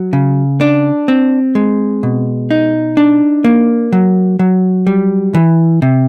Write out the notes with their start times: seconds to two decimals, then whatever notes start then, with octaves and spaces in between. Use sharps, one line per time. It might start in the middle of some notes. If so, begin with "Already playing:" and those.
Already playing: F#3
0.13 C#3
0.61 D4
1.08 C4
1.55 G#3
2.03 B2
2.51 D#4
2.97 D4
3.44 A#3
3.92 F#3
4.39 F#3
4.87 G3
5.34 E3
5.82 C3